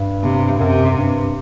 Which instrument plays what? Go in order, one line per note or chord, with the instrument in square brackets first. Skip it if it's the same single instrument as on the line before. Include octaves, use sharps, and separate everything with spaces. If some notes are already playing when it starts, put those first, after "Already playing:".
Already playing: [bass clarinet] G2
[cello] C3
[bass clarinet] F#2 [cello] C3
[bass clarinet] F#2
G2